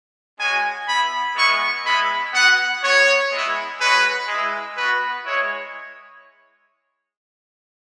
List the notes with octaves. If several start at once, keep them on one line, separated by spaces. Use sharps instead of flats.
G#3 C#4 F#4 G#5
B3 E4 B5
G#3 B3 E4 C#6
G#3 B3 E4 B5
B3 F#4 F#5
B3 F#4 C#5
G#3 B3 E4
G#3 C#4 F#4 B4
G#3 E4
B3 F#4 B4
G#3 E4 C#5